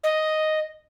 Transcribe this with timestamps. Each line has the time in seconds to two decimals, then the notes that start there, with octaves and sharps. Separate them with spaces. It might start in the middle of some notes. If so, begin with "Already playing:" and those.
0.04 D#5